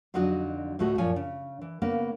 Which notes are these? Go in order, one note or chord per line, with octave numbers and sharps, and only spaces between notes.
F2 D3 F#3 D#4 F#4 D#5
D2 A2 A3 F#4 D#5
F#2 A#2 F3 C#5 G#5
C#3
E3
C#3 A#3 B3